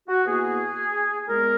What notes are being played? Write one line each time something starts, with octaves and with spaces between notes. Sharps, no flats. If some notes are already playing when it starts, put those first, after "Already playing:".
F#4
B2 A#3 E4 G#4
A#2 G#3 B3 A#4